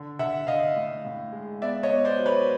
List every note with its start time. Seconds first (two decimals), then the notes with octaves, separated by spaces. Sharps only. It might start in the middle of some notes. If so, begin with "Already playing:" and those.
Already playing: D3
0.19 D3 E5 F#5
0.47 D3 D#5 F5
0.76 A2
1.05 A2
1.32 G#3
1.62 B3 D5 E5
1.83 C#5 D#5
1.90 B3
2.05 C5 D5
2.19 F#3
2.26 B4 C#5